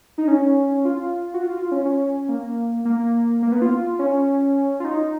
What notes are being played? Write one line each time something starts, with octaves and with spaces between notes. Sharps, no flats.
D#4
C#4
F4
F#4
F4
F4
C#4
C#4
A#3
A#3
A#3
B3
F4
C#4
F4
D#4